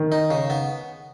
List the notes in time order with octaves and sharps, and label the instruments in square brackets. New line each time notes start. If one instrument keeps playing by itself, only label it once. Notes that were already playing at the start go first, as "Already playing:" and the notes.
Already playing: [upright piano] D#3
[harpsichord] D#4
C#3
B3